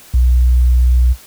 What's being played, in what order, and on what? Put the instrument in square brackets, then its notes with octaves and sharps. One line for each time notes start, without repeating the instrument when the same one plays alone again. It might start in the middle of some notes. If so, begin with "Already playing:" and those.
[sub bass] B1